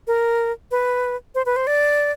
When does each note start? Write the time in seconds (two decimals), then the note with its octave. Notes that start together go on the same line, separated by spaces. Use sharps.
0.07 A#4
0.71 B4
1.35 C5
1.46 B4
1.56 C5
1.67 D5